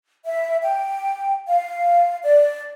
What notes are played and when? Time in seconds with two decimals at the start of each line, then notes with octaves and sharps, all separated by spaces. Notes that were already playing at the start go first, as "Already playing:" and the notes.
0.25 E5
0.62 G5
1.48 F5
2.23 D5